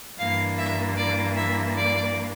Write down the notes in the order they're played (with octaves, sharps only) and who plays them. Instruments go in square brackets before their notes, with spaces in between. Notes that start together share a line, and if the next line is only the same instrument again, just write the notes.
[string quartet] G2 E3 A#3 D4 F5
E5
D5
E5
D5